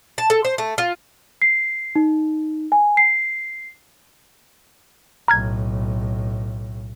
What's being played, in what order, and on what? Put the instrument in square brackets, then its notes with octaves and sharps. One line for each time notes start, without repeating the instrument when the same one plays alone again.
[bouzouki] A5
A4
C5
A3
F4
[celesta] C7
D#4
G#5
C7
[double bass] B1 A2 [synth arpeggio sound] A#5 F6 G#6